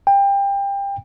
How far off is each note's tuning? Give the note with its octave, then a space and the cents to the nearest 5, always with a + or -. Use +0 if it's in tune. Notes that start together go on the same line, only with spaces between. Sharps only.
G5 +25